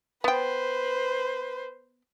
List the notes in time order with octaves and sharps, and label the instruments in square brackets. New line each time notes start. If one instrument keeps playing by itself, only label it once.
[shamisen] B3 G5 [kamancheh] B4 C5